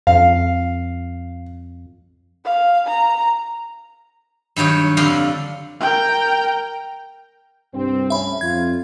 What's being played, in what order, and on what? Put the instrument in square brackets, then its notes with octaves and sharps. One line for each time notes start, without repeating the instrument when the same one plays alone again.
[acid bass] F2 [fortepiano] F5
[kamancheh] F5
A#5
[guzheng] G2 D#3 F#3 C#5
F2 D3 G3 F5
[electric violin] A#4 G5
[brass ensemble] C2 G2 [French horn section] C4
[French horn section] D3 A3 C#4 [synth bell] E5 B5
[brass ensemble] F2 [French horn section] F4 [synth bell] G#6